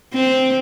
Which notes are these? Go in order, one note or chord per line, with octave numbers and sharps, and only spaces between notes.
C4